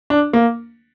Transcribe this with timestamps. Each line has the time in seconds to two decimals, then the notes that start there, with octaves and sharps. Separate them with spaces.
0.10 D4
0.33 A#3